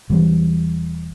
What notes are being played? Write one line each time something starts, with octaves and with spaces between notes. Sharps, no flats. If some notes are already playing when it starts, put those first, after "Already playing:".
E1 E3 G3